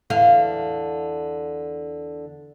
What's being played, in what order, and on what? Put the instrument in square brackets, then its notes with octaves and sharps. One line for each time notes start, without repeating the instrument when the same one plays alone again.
[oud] E2 D3 F5